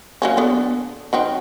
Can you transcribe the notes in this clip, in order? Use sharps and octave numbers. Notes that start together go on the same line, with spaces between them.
F#3 A#3 C#4
B3 D4 A4
D#3 F#3 C4